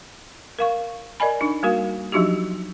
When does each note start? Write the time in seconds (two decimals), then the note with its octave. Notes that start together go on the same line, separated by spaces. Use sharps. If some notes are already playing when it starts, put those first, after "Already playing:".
0.59 A#4 F5 C#6
1.20 A#4 D5 D#5 G#5 B5
1.41 D4 D#4
1.63 G3 A#3 F#4 A#4 F5
2.12 F3 F#3 D4 D#4 F#4 G4